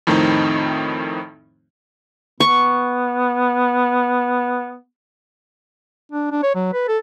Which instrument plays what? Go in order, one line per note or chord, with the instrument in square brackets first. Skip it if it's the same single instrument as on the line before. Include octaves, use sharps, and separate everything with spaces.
[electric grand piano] F2 A2 D#3 A3 C4 D#4
[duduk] B3 [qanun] C#6
[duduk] D4
D4
C#5
F#3
B4
A4